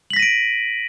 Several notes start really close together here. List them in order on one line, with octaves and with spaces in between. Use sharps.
F#7 B6 A#6 D#7 D7